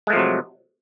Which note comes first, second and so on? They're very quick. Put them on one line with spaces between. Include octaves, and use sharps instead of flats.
G#3 A3 F3 C3 F#3